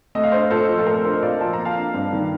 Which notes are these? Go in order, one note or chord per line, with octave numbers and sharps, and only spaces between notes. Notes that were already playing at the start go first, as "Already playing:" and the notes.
A3 D#5
F5
D4 C5 D#5
A#2 A4 C5
F3
A4
A3 A#4
D4 A#4
A#2 D5 F5
F3 A5
A#5
A#3
F5 A5
D4
G2
D#3